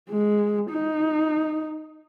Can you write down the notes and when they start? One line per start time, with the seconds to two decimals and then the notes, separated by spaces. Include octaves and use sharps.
0.10 G#3
0.70 D#4